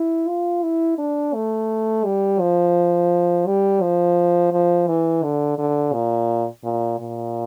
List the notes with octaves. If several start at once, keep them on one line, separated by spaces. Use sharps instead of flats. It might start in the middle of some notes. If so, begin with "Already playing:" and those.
Already playing: E4
F4
E4
D4
A3
G3
F3
G3
F3
F3
E3
D3
D3
A#2
A#2
A#2